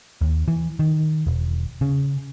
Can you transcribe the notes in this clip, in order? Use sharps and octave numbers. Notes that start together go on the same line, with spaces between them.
D#2
E3
D#3
E1
C#3